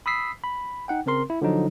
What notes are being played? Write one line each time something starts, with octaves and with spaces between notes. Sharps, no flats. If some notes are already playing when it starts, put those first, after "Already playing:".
B5 D#6 E6 B6 C7
B5
D#4 F#5 G5
C#3 C4 A#4 C6
E4
D3 F3 F#3 D#4